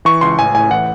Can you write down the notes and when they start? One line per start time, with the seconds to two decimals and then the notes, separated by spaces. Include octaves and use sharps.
0.05 E3 C#6
0.21 C#2 C6
0.39 A1 G#5
0.55 A2 G#5
0.70 E3 F#5